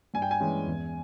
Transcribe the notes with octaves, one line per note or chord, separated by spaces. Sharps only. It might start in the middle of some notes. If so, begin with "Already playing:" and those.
G2 G#5
G5
G#5
E3 G#3 C#4
E2